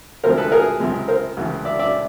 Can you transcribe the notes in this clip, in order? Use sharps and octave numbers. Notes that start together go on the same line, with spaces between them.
D2 C3 F3 G#3 A#4 C5
A4 B4
G#4 A#4
C#2 C3 F3 G#3
A#4 C5
C#2 C3 E3 A3
D5 E5
D5 E5